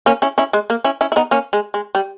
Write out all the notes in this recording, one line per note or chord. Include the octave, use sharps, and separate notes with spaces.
A#3 C#4
C#4 E4
C#4 E4
G#3
A#3
C#4 E4
C#4 E4
E4
B3 D#4
A#3 C#4
G#3
G#3
G3